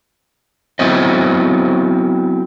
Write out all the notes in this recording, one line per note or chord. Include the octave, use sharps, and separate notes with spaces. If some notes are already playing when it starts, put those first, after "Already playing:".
F#3 B3 C4 E4 C5 D#5